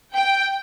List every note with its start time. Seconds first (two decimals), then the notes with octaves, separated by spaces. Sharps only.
0.14 G5